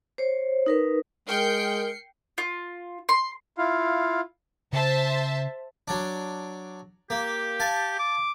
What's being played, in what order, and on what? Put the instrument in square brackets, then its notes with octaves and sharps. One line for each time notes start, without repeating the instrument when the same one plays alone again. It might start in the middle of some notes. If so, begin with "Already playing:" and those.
[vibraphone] C5 C#5
D#4 A#4 B4
[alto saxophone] G#3 [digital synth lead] A#4 [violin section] G5 G6 [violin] C7 C#7
[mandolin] F4
C6
[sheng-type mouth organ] E4 F4 F5
[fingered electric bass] C#3 [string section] C5 E5 A5
[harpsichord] F#3 D4
[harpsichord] A#3 [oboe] G4
[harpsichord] F5 G#5 A5
[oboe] D6